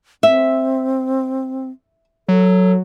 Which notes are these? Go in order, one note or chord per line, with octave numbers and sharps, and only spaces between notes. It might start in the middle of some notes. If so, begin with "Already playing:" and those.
C4 E5
F#3 A4